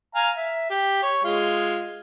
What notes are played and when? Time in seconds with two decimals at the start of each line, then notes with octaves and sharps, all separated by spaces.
0.15 F5 G#5 A#5
0.37 E5
0.70 G4
1.03 C#5
1.24 G#3 F4